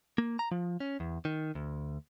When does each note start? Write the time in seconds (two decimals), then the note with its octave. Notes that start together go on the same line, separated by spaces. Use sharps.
0.18 A#3
0.39 A#5
0.51 F3
0.80 C#4
1.00 E2
1.25 D#3
1.55 D2